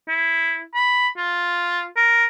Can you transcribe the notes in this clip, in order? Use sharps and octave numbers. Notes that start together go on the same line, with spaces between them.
E4
B5
F4
A#4